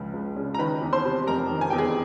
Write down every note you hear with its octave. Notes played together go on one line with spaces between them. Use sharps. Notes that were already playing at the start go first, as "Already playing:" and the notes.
Already playing: C#2 C#3 F3
C#2
C#3
A#5
D#3 B4 B5
E2
C5 C6
C3
F1 A#4 A#5
D#3
G#5
E2 G5
G#4 G#5